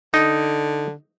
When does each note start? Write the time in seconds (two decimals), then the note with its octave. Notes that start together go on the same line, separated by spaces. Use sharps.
0.14 D3 D#4